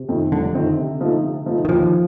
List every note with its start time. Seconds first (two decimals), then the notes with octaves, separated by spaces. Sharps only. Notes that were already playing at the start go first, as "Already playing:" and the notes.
Already playing: C3
0.08 F2 D#3 A3 C4
0.32 F1 D3
0.54 F2 D#3 A3 C4
0.77 C3
1.01 F3 A3 D#4
1.24 C3
1.46 F3 A3 D#4
1.65 D#3
1.69 D#2 F3